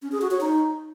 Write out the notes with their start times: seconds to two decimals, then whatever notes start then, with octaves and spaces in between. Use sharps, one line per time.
0.02 C#4
0.12 G#4
0.22 F#4
0.31 C#5
0.41 D#4